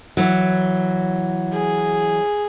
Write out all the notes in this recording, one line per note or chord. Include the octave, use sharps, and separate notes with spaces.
E3 F#3
G#4